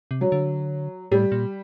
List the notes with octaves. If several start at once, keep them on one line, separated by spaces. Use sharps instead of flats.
C3
F#3
D3
A2 G3
A#2